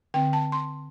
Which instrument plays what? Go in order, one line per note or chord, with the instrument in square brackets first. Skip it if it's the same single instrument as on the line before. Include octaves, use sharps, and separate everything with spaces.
[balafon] D3 C4 G5
A5
C6